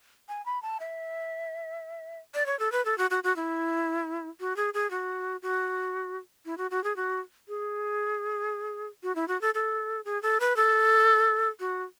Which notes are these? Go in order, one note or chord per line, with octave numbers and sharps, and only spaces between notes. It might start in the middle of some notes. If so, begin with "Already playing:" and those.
G#5
B5
A5
E5
D5
C#5
A4
B4
A4
F#4
F#4
F#4
E4
F#4
G#4
G#4
F#4
F#4
E4
F#4
F#4
G#4
F#4
G#4
F#4
E4
F#4
A4
A4
G#4
A4
B4
A4
F#4